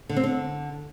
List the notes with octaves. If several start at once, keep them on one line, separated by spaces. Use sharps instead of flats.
D3
C4
D3